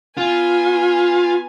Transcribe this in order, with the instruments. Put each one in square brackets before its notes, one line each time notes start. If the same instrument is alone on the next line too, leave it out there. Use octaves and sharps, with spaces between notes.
[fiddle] B3 G#5 [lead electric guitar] F4